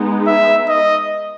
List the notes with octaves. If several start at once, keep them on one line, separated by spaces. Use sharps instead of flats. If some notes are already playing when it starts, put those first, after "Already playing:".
Already playing: G#3 B3 D#4
E5
D#5